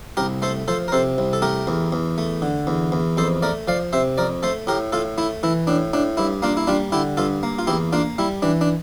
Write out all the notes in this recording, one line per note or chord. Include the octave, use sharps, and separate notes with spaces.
C2 G4 A#4
A3 A4 C5
F3 A4 C5
A#4
C3 A4 C5
C2
A4
A3 G4 A#4
E2
E2
A3
D3
E2
E2
F2 A4 C5
A3 A#4 D5
F3 D5 F5
C3 C5 E5
F2 A#4 D5
A3 A4 C5
A2 G4 A#4
A2 F4 A4
A3 E4
E3 E4
A2 D4
A2 D4
G2 E4
A#3 D4 F4
E4
G3 D4 F4
D3 E4 G4
G2 F4 A4
A#3
F4
E2 E4 G4
A#3 D4 F4
G3 E4
E3 D4
D4